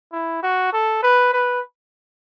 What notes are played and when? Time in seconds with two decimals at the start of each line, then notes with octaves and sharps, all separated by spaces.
0.12 E4
0.42 F#4
0.73 A4
1.02 B4
1.33 B4